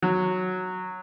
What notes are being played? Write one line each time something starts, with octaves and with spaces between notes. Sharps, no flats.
F#3